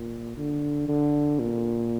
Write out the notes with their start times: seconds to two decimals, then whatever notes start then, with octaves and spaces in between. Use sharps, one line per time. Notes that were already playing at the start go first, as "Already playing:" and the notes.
Already playing: A#2
0.37 D3
0.88 D3
1.39 A#2